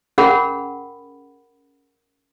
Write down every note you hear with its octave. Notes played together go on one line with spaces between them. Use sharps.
C#4 G#4 A#4 F#5 B5